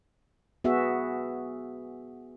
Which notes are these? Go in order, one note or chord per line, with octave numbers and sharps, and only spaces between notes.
B3 F#4 G#4 E5